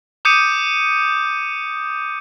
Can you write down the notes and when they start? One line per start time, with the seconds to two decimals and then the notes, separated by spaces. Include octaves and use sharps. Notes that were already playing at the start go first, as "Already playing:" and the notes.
0.25 D6 D#6 G6 C#7 D#7